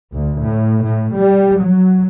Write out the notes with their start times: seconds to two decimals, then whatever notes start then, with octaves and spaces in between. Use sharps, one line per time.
0.13 D2
0.42 A2
0.84 A2
1.18 G3
1.60 F#3